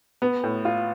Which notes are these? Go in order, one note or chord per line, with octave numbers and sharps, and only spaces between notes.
B3
A2
F4